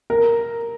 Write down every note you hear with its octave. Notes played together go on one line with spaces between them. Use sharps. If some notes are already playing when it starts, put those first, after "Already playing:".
A#4